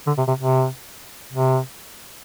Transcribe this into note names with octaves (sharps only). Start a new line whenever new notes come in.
D3
C3
C3
C3
C3